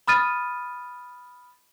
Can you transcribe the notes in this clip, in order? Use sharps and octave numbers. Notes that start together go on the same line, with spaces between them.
B5 D#6 F6 A6 D#7